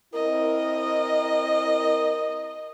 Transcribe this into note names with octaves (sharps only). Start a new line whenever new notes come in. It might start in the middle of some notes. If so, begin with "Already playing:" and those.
C4 E4 A#4 D#5